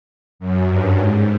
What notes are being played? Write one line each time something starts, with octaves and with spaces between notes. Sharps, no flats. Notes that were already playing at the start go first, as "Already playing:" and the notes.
F#2
G2
G#2